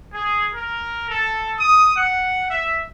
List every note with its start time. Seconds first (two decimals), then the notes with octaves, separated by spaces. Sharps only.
0.14 G#4
0.54 A#4
1.10 A4
1.58 D#6
1.97 F#5
2.51 E5